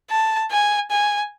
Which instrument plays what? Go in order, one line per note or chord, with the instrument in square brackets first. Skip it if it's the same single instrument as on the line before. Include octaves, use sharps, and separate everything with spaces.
[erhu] A5
G#5
G#5